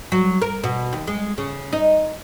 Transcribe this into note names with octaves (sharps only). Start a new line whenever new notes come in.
F#3
A#4
B2
D#2
G#3
C#3
D#4